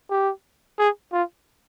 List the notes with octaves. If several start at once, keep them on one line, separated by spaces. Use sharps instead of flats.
G4
G#4
F4